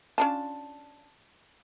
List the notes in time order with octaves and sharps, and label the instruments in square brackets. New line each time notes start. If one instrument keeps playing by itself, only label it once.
[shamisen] C#4 D4 F4 [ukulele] A5